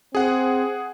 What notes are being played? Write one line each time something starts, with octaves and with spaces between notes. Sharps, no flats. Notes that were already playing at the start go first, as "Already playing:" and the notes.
C4 G#4 F#5